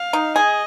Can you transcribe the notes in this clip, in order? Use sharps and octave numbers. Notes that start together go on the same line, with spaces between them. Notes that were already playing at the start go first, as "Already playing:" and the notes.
Already playing: F5
D#4
G#4 D#5